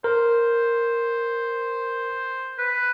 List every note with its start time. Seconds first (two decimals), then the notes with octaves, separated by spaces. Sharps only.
0.04 A#4 C5
2.58 B4